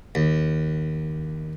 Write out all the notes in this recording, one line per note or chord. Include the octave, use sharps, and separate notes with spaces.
D#2